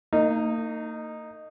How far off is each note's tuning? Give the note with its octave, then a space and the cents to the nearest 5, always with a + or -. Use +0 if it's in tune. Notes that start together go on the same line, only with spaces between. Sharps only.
A#3 -40 D#4 -5